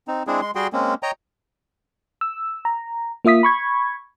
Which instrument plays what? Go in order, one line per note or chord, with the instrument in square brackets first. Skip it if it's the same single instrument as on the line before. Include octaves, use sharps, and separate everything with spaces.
[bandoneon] C4 D#4
G#3 C4 D4 E4 G#4
G#3 C6
G3 F#4 G#4 G5 C6
G#3 A#3 C4 C#4
C#5 D#5 G5 A#5
[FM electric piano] E6
A#5
A#3 F4 E5 D#6 B6
B5 C#6 G#6